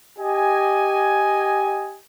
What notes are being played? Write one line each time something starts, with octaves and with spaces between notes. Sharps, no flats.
G4 D#5 G#5